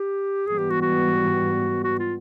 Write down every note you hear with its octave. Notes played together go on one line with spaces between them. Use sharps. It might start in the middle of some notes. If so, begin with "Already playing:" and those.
Already playing: G4
G#2 E3 G3 B3 G#4
G4
F#4
F#4
F#4
F4